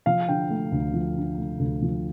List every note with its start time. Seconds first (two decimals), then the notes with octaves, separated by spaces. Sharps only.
0.06 F3 F5
0.28 D3 G5
0.50 A3
0.72 D2
0.94 F3
1.17 D3
1.38 A3
1.60 D2
1.82 F3